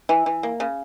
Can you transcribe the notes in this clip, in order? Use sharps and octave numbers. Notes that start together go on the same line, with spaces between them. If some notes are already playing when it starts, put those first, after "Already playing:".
E3
E3
A#3
C#3